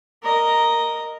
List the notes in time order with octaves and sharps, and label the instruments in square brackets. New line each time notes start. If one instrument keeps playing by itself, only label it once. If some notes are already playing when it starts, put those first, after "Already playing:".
[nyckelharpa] A#4 D#5